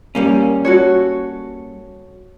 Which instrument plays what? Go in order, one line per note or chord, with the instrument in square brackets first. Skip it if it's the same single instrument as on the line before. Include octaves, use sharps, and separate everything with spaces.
[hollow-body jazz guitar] G3 A#3 C#4
[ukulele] F#4 A4 C#5